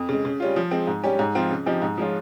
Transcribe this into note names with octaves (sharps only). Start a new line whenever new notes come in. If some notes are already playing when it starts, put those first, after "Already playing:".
Already playing: F2
C#3 G#3
C#3
G3 C#4 F4
F3
G#3 C4
G#2
G3 C#4 G4
G#2
F3 C4 F4
C#3
F3 C4 D#4 G4
G#2
F3 G#3 C#4 F4